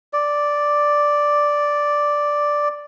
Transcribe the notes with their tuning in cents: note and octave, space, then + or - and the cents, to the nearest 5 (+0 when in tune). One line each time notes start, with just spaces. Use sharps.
D5 +0